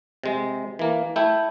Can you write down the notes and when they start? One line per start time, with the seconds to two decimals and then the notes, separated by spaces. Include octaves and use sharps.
0.24 C3 G#3
0.79 E3 A#3
1.16 A3 E4 G5